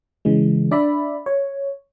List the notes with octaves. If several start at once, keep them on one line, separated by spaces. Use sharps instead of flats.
C#3 E3 G#3
D4 D5 E5 B5
C#5